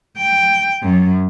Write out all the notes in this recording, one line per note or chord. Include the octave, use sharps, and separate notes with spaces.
G5
F#2